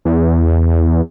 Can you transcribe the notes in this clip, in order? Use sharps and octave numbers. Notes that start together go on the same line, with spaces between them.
E2